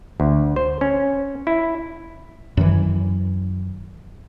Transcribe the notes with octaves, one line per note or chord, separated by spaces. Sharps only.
D2
C5
C#4
E4
F#2 D#3 E3